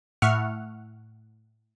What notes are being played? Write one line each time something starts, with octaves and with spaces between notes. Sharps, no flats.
A2 E5 F#5 C#6 F6